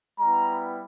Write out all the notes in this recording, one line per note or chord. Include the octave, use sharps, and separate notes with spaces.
G3 B3 E4 A#5